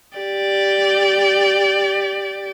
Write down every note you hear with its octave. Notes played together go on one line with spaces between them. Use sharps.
G4 D5